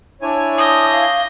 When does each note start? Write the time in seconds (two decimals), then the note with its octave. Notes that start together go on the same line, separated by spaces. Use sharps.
0.22 D4 E4 C#5 G#5
0.58 D#6 G6 A#6
0.92 F5